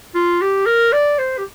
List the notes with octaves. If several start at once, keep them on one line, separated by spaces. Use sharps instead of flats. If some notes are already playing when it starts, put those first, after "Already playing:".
F4
G4
A#4
D5
C5
G4